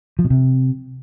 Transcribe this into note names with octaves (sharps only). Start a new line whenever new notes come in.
F3
B2
C3